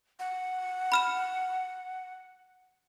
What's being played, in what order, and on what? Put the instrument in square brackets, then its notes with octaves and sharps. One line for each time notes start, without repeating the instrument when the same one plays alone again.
[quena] F#5
[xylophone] B5 F6 E7